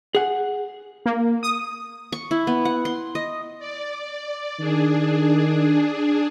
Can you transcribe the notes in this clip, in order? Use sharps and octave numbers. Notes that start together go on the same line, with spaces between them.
G#4 F#5
A#3
D#6
C#6
E4
B3
F#5
C6
D#5
D5
D#3 D4 G#4